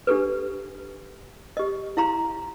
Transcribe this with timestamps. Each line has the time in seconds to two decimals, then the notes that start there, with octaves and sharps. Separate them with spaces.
0.07 D4 G4 A4 B4
1.57 G4 D#5
1.97 E4 F5 A#5 C6